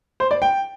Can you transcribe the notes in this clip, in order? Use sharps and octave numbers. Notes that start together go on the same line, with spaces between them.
C5
D5
G5